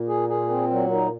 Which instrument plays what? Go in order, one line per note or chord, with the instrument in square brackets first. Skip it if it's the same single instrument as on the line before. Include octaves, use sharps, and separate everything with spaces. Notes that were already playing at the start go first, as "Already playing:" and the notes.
Already playing: [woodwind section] A#2
[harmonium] G#4
G#4
C4
F#3
D#4